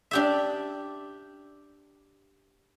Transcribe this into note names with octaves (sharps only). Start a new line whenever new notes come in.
D4 G4 E5